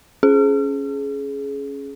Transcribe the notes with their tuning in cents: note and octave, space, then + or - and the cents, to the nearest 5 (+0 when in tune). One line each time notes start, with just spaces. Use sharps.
C#4 +0 G#4 +20